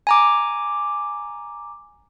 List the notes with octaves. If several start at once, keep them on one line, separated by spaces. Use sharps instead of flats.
G#5 A#5 D6